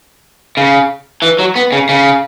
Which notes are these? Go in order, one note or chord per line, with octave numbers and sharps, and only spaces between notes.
C#3
E3
F#3
B3
C#3
C#3